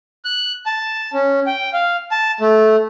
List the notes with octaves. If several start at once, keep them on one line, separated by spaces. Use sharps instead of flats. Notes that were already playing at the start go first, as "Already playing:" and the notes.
F#6
A5
C#4
G5
F5
A5
A3